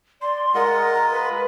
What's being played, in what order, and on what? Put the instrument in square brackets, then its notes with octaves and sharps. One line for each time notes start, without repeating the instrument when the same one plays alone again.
[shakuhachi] D5 [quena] C6
[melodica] G#3 F4 D#5 [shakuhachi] A#4 [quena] F#5
[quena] A#5
B4